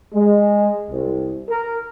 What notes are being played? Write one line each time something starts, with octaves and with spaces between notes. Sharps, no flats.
G#3
C2
A#4